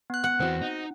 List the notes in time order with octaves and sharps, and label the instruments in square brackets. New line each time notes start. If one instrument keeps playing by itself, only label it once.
[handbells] B3 F#6
[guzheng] F#5
[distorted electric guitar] E2 E3 [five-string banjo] C4 F#4
[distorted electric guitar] D#4